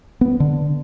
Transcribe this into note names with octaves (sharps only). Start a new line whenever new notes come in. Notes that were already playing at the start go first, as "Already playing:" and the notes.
B3
D3